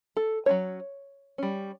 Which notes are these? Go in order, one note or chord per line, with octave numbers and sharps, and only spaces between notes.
A4
F#3 A3 C#4 C#5
G3 C#4